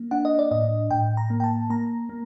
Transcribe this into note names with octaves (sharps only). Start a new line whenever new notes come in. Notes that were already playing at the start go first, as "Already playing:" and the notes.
Already playing: A#3
D4 F#5
D#5
D5
A2 D#5
A2 G5
A#5
A#3
G5
A5
A#3 A#5
A#3